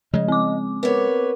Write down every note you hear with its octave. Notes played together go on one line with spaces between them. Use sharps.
C#3 F3 G#3 D#5
C4 D6
B3 A#4 C#5